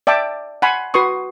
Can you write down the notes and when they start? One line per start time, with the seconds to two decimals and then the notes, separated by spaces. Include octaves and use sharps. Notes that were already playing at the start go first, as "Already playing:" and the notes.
0.07 D5 E5 G5 A5 D6
0.62 F#5 G#5 B5 C6
0.94 F#4 B4 C6 C#6 D#6